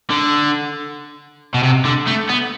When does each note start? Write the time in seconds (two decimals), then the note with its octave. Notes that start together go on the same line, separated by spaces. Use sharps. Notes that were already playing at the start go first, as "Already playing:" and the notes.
0.10 D3
1.54 B2
1.63 C3
1.85 D3
2.07 A3
2.30 B3